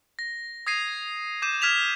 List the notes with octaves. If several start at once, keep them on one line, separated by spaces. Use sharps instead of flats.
A#6
D#6 G#6 A#6 C7 D#7
D6 G6 D#7 E7
F6 G#6 B6 E7 F7